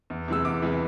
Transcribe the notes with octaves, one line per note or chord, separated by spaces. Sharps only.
E2
C3 E3 G#3 E6
E2 D6
C3 E3 G#3